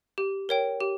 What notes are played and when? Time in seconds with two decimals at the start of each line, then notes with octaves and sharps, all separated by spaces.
0.18 G4
0.49 A#4 C#5 G5
0.80 G4